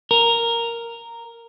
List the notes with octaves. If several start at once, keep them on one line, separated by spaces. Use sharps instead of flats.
A#4